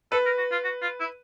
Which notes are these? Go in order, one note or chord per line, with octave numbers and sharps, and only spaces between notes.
A4 B4
A#4
F#4
F4
F#4
F4
E4